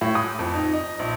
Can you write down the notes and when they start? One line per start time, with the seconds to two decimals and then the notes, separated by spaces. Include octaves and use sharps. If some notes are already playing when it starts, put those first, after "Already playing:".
0.01 A2
0.15 D#6
0.39 F2
0.54 D#4
0.73 D#5
0.99 A#1